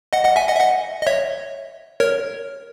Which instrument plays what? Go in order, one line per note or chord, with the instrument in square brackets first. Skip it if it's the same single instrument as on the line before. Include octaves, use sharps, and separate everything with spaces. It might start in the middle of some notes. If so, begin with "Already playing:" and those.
[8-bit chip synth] D#5 F#5
D#5 F#5
E5 G#5
D#5 F#5
E5
D#5 F#5
D#5
C#5 E5
A#4 C#5